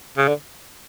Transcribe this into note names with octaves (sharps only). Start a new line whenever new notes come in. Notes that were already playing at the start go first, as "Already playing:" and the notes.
C#3
D3